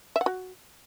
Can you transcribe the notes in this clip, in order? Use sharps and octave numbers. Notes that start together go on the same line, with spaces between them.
E5
F#5
F#4